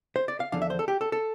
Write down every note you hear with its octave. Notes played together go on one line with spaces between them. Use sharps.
C5
D5
F5
E2 D3 F3 D4 F5
E5
C5
A4
G4
A4
A4